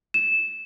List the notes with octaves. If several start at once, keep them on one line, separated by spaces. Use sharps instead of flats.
E7